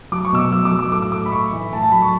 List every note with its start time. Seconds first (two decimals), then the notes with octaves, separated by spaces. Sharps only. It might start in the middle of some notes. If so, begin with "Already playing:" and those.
0.12 F#3 D6
0.25 C#6
0.32 B2 E6
0.39 D6
0.51 F#3 E6
0.65 D6
0.72 F#3
0.79 D6
0.92 A2 D6
1.02 E6
1.12 A2 D6
1.25 B5
1.32 A2 C#6
1.52 E3
1.72 A2 A5
1.82 A5
1.92 F#3 B5
2.02 C#6